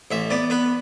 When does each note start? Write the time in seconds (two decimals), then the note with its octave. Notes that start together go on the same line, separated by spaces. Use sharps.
0.11 A1 E5
0.30 B3 D5
0.50 B3 B4